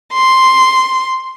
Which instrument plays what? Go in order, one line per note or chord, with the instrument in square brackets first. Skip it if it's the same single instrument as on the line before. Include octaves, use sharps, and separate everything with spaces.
[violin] C6